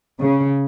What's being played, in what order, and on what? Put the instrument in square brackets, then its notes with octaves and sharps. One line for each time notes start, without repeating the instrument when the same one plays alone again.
[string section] C#3